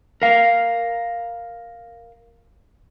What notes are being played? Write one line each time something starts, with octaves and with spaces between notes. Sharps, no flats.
A#4 F5